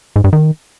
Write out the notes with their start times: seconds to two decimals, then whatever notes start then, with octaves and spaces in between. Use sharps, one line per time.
0.16 G#2
0.24 G2
0.33 D#3